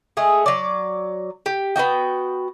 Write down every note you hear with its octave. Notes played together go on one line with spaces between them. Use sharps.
G#3 A3 G#4
F#3 D5
G4
B3 D#4 F#4 G5